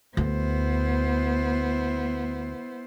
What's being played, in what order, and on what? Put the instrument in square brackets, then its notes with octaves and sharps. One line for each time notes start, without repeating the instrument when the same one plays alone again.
[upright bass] D2 [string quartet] B3 E4 C5